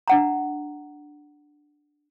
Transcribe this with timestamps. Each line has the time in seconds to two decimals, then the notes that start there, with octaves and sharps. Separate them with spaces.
0.08 D4 F#5 A#5